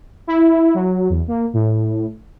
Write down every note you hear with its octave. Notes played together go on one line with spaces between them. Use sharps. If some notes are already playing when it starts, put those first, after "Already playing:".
E4
F#3
E2
A#3
A2